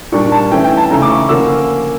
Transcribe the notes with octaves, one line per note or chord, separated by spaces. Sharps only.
A#2 G3 A#3 D4 C#6
A5
E3 A3 C#4 G5
G5
A5
C#3 E3 A3 C#4 A#5
D6
C#6
D3 F3 A#3 C#4 E6